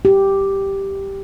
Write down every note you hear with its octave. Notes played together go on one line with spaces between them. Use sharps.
G4